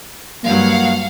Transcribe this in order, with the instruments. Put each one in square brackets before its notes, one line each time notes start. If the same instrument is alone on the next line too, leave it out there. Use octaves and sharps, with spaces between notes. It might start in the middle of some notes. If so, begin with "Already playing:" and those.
[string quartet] G2 F#3 [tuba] A#3 [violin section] F5 F#5